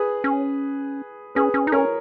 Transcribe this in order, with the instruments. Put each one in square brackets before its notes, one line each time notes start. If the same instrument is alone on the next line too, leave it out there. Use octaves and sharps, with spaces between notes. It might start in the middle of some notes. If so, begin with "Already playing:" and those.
Already playing: [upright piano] G#4 B4
[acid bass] C#4
[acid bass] C#4 [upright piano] G#4 B4
[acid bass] C#4
D#4
[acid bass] C#4 [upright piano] A#4 C#5